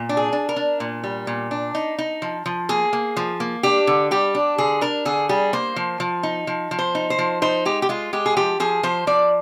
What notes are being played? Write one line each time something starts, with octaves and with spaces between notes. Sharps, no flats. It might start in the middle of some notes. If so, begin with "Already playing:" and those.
Already playing: A#2
D4
G#4
D4
A#4
D4
A#2
G3
A#2
D4
D#4
D#4
F3
F3
A#3 G#4
A#3
F3
A#3
D4 G4
D3
G3 G4
D4
D3 G#4
D4 A#4
D3 G#4
G3 G#4
A#3 C5
F3
F3
D#4
F3
F3
C5
D#4
C5
F3
D#4 C5
G#3 G4
G4
G#3 F4
G#3 G4
G#4
F3 G4
F3 G#4
F3 C5
F3 D5